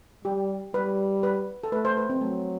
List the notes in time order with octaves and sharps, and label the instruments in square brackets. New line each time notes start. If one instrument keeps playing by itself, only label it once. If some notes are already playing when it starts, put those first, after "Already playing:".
[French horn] G3 [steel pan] G4
[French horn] G3 [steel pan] B4
[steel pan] B4
A4
[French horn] A3 [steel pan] B4
[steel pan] C5
B4
C4
[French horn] F#3 [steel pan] A3